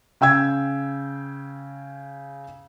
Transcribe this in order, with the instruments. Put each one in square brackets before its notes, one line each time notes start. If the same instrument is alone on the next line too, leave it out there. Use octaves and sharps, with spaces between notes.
[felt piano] C#3 G5 E6 G#6